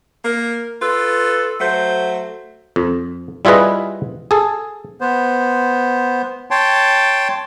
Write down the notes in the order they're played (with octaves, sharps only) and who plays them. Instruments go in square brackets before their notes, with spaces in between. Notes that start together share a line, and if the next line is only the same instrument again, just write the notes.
[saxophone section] A#3 A#4
F4 A4 B4
F#3 A3 C5
[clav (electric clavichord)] F2
G3 E4 F4 G#4 B4 D#5
G#4 A4
[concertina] B3 C5
C#5 G5 A5 C6